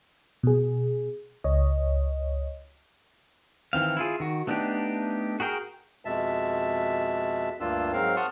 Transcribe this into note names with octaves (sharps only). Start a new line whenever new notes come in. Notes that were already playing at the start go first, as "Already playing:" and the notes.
B2 G#4
C#2 C#5 D#5
D#3 E3 C4 F5
E4 F4 G#4
D#3 F#4
A3 B3 D4 D#4 G4
F#4 G#4 A#4 G5
F2 B2 G#3 E5 A5
D2 G2 A#3 D4 F4 E6
G#2 F#3 C4 A#4 F5
F#5 A5 C6 C#6 D#6 F6